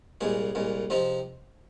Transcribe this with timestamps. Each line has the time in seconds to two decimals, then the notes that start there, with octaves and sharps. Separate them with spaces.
0.21 C2 A#2 G#3 G#4
0.55 C2 A#2 G#3
0.90 C3 F3 C4 D#4